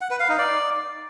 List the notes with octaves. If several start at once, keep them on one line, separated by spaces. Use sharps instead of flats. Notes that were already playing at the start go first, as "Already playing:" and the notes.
F#5
B4
F5
D#4
D5